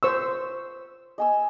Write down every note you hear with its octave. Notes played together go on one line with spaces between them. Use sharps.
C5 C#6 E6
D#5 G#5 E6